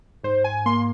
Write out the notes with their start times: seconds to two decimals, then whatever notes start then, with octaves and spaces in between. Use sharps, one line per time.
0.23 G#2 C5
0.44 G#5
0.66 A#3 C6